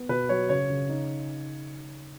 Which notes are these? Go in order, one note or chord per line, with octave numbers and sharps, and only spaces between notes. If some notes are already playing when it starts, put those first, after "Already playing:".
Already playing: B3
B2 B4
F#3 C#5
C#3 C#5
C#3
D#4